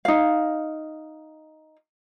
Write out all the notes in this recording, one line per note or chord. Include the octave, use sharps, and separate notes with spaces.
D#4 F5